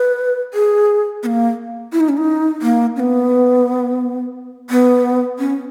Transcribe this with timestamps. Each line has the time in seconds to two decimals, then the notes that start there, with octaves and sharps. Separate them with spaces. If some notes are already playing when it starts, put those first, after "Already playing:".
Already playing: B4
0.54 G#4
1.23 B3
1.26 A#3
1.92 E4
2.00 D#4
2.09 C#4
2.17 D#4
2.62 A#3
2.96 C#4
3.00 B3
4.70 B3
5.39 C#4